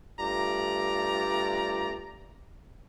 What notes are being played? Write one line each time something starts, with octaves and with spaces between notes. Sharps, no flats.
G2 A3 F4 G4 D5 A#5